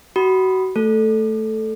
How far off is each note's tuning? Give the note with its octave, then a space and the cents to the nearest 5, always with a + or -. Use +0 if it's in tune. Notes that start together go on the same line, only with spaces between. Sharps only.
F#4 +25 B5 +0 D#6 -5
A3 +0 A4 -5